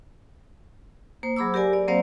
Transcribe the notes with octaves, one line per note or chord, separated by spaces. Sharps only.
A#3 C5
F#3 G#4 B5 D6 E6
G4 A#4 D5 G#5
D5
F#3 A#3 C4 C5 D5 F5